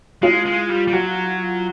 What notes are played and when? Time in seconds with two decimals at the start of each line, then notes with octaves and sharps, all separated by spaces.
0.22 G#3 F4
0.46 G#3
0.69 G3
0.87 G3
0.93 F#3 F#4